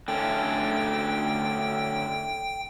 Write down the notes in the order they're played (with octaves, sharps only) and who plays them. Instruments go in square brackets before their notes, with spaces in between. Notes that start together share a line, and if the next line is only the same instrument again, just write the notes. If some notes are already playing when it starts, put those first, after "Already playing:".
[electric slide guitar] D3 A3 C#4 [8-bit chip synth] G5